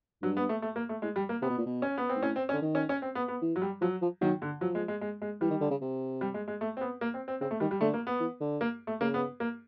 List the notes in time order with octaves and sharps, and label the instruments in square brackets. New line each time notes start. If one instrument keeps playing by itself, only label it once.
[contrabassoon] G2 [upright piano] F#3
[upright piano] B3
A3
A3
A#3
A3
[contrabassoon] A2 [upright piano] G#3
[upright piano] G3
A#3
[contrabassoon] C3 [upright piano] B3
[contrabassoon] B2
A#2
B2
[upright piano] C#4
B3
C4
[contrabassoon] G#2
[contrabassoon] A2 [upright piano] C#4
[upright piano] C4
C#4
[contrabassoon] D3
D#3
[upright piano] C#4
C#4
C4
B3
B3
[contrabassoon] E3
[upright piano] F#3
G3
[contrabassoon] F3 [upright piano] F#3
[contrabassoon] F3
[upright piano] D#3 [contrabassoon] F#3
[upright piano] D3
[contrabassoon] F3 [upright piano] F#3
[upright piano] G#3
G#3
G#3
G#3
[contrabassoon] E3 [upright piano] G3
[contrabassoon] D#3
D3
C#3
C3
[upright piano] G3
G#3
G#3
A3
C4
B3
A#3
C4
C4
[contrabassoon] C#3 [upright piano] C4
[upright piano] A3
[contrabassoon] D#3 [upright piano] G3
[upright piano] G3
[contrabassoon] D3 [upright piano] A3
[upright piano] A#3
B3
[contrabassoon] E3
D3
[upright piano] A#3
A3
[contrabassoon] C#3 [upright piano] A#3
[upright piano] B3
A#3